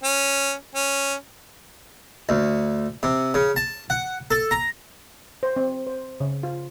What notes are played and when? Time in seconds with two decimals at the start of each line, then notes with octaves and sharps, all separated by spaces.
0.03 C#4
0.75 C#4
2.29 D2
3.03 C3
3.34 C#3
3.56 A5
3.90 F#5
4.31 A4
4.51 A#5
5.43 C5
5.56 C4
5.87 C5
6.20 C#3
6.43 F4